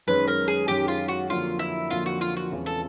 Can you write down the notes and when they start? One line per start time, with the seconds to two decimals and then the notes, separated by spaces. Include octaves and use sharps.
0.07 F#2 D#3 G#3 C#4 B4
0.28 A#4
0.48 G#4
0.68 F#2 D#3 G#3 C#4 G4
0.88 F4
1.08 F#4
1.29 F2 D3 F#3 A#3 F4
1.59 E4
1.90 F2 D3 F#3 A#3 F4
2.06 F#4
2.21 F4
2.37 F#4
2.52 E2 C#3 F3 G#3 C4
2.66 A4